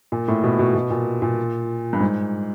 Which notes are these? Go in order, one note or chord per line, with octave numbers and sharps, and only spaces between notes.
A#2
A2
B2
B2
B2
A#2
A#2
G2
G#2